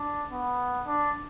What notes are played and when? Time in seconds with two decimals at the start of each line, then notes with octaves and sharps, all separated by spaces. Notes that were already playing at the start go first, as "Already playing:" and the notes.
Already playing: D4
0.31 B3
0.87 D4